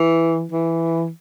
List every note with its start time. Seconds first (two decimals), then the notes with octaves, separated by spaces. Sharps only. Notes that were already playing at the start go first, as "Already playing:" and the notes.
Already playing: E3
0.52 E3